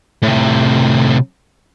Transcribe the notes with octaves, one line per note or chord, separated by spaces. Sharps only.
A2 C3